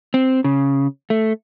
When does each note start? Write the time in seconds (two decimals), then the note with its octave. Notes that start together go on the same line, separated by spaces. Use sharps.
0.14 C4
0.44 C#3
1.10 A3